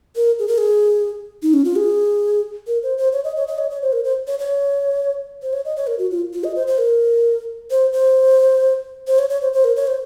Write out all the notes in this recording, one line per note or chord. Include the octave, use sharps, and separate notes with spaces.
A#4
G#4
A#4
G#4
D#4
C#4
F4
G#4
A#4
C5
C5
C#5
D#5
C#5
D#5
C#5
C#5
C5
A#4
C5
C#5
C#5
C5
C#5
D#5
C#5
A#4
F#4
F4
F4
D#5
C5
C5
A#4
C5
C5
C5
C#5
C#5
C5
C5
A#4
C#5
C5